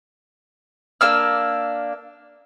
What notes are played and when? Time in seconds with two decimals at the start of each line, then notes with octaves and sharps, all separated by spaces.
1.01 A#3 D4 E6 F6